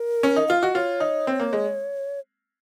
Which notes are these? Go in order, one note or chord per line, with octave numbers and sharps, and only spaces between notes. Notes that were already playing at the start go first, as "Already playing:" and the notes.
Already playing: A#4
C#4
D#4
F4 F5
F#4 D#5
F4 C#5
D#4
C4
A#3
G#3